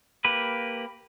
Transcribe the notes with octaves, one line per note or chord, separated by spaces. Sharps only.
A#3 G4 B4